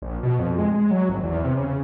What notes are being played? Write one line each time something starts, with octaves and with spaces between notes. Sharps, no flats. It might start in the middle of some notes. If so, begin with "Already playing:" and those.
A#1
B2
F2
G#3
G#3
F#3
G#1
E2
C3
C#3